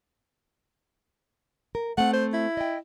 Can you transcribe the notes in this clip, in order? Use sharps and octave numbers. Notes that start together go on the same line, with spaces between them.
A#4
A3 C4 F#5
C5
E4
D#5 G5